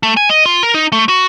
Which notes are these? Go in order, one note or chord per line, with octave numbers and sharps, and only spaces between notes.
A3
G#5
D#5
F4
A#4
D#4
A3
F#4